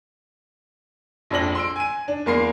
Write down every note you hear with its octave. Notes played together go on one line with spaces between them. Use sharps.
A#1 F2 D4 A#6 F#7
C6 E6 D7
G#5 D#7
D4
E2 A#3 A#4 C6 C7